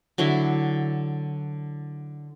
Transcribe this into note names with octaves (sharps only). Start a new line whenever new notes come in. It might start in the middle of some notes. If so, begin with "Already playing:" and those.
D3 F#3 D4 E4